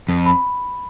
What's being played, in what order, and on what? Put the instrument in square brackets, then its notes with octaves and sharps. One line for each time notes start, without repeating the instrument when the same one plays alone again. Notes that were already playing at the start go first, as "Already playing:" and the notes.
[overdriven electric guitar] F2
[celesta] B5